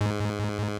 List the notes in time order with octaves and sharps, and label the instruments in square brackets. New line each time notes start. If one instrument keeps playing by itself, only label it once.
[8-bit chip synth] G#2